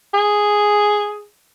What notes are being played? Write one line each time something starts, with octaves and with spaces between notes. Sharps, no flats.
G#4